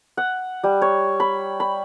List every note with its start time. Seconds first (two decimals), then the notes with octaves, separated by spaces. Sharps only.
0.17 F#5
0.64 G3
0.82 C#5
1.20 B5
1.60 B5